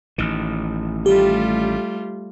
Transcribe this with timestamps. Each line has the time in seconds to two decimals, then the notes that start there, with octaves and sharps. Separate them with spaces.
0.18 A1 D#3
1.06 G3 A3 F4 G4